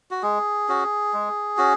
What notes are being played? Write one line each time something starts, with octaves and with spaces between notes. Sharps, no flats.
F#4
G#3 G#4
C#4 F#4
G#3
C#4 F#4